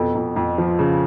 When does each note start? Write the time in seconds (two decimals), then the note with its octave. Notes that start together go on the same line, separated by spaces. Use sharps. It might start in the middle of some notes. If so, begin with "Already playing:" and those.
Already playing: F2 B2 A4
0.15 F2
0.36 F2
0.58 F3
0.79 C#3